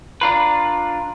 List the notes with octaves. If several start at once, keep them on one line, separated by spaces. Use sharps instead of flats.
D4 F4 B4 A#5 C6